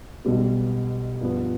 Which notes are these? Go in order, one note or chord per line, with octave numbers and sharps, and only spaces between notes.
B1 B2 G3 B3
G2 F3 B3